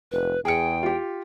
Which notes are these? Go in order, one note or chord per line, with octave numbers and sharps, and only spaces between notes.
F1 B4
E2 G#4 G5 C#7
F4 G4